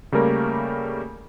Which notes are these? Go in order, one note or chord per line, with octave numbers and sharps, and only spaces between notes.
C#3 G3 A3 A#3 A#4